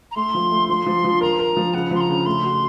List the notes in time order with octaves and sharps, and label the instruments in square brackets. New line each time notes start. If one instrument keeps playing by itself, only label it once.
[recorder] A#5
[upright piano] A3 [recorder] C6
[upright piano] F3
A3
[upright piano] F3 [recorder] C6
[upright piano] F3
F3
[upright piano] A#4 [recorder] A#5
[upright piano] A#4
F3
[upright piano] C#3 [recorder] F#5
[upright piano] F3 [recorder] C6
[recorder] A#5
[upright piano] C#3
[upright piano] A3 [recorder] C6
[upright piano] F#4